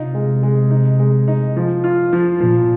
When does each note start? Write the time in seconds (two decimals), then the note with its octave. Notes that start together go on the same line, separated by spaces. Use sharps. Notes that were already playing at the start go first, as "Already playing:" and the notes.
Already playing: C3 D#4 F4
0.14 G#3
0.43 G#3
0.71 D#4
0.99 G#3
1.28 D#4
1.56 F3
1.84 F4
2.13 F3
2.41 A#2 F3